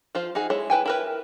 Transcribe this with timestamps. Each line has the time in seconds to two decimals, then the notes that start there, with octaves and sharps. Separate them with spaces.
0.15 F3 F4 C5
0.35 D#4 F#4 G#4
0.50 G#3 E4 C#5
0.70 E4 B4 G5 G#5
0.86 E4 A#4 B4